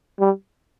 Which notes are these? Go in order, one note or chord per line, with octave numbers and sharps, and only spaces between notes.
G3